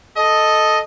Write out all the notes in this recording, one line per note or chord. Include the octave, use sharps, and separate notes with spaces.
A4 D#5